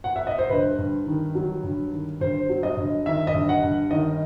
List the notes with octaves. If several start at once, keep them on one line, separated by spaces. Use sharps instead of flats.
F#5
E5
D#5
C5
G2 B4
G2
D#3
F#3
G2
D#3
G2 C5
F#3
D#5
G2
D#3 E5
D#5
G2
F#5
G2
D#3 D#5